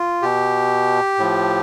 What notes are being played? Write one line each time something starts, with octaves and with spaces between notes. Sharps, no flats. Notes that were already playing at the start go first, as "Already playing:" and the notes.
Already playing: F4
B2 G4
A2 F3